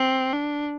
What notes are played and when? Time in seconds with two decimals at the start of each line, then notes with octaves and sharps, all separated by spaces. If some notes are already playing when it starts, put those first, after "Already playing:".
Already playing: C4
0.33 D4